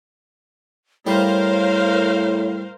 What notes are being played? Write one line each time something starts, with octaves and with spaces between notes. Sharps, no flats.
A2 G3 A#4 C5 C#5 F5